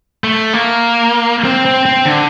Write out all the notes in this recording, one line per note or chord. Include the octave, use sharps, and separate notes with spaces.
A3
A#3
C4
C4
C4
D3